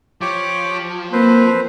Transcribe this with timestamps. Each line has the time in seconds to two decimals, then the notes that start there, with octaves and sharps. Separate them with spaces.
0.21 F3 G4 C#5 D6
1.12 A#3 C4 B4 C5